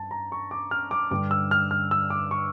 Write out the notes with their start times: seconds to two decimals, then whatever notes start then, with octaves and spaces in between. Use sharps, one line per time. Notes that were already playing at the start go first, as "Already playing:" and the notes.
Already playing: G2 A5
0.11 A#5
0.32 C#6
0.51 D6
0.71 F6
0.91 D6
1.11 G2 D3 G3 D6
1.31 E6
1.51 F6
1.71 F6
1.91 E6
2.10 D6
2.31 C#6